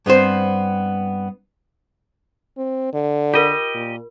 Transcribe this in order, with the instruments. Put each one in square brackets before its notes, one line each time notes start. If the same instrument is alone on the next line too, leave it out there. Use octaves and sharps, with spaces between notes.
[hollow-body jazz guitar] G2 B3 C4 C5
[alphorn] C4
D3
[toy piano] F4 A#4 [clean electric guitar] G4 D#5
[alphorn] A#2